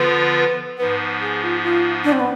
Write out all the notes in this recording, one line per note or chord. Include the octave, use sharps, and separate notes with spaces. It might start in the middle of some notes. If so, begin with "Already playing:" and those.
Already playing: D3 F3 B3 F4 B4
G#2 F3 B3 B4
G#4
F4
F4
D4
C4
B3